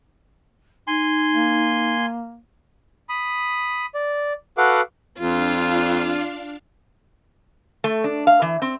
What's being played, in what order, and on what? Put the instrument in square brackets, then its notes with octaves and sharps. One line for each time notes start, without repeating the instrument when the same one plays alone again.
[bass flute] D#4 [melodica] G#5 C6
[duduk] A#3
[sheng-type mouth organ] B5 D#6
D5
F#4 A4 B4 F5 F#5 D6
[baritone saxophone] F2 [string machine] D4 F5 [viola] F4
[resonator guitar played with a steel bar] A3
D4
F5
E3
C4